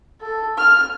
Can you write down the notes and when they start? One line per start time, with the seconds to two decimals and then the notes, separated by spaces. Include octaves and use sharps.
0.21 A4
0.58 F6